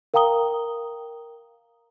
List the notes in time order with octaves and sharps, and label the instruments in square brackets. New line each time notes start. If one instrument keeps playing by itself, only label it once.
[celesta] A#4 F5 G5 A#5 D#6 G7